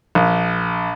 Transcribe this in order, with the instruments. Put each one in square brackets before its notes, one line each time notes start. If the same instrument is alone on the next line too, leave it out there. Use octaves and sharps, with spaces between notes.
[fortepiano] A#1